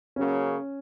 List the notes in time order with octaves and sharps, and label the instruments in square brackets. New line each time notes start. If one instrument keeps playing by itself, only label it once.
[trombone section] C#3 F#3 A#3 [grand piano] C#4